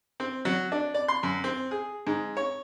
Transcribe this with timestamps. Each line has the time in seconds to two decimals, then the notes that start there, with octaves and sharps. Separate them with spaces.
0.20 C4
0.45 F#3
0.72 D4
0.94 D5
1.08 C6
1.23 F#2
1.44 C4
1.71 G#4
2.07 G#2
2.37 C#5